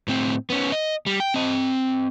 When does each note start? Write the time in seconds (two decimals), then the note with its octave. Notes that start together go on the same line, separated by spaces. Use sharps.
0.08 A2 C4
0.50 B3 C#4
0.72 D#5
1.06 G3
1.20 G5
1.34 C4 D#5